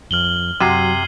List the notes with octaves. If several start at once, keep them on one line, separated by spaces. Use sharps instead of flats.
F2 F6 F#7 G7
F#2 C3 F#3 F#5 C6 G#6 C7 D#7